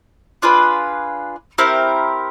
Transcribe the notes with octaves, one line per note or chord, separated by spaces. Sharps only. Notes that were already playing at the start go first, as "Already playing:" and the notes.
D4 F4 G#4 B4
C4 E4 G4 A#4